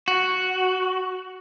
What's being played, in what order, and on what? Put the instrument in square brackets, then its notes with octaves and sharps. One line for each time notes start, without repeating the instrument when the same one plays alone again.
[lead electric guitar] F#4